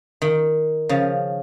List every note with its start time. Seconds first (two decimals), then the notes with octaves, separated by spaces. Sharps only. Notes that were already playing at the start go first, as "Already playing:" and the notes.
0.22 D#3
0.89 C#3 F3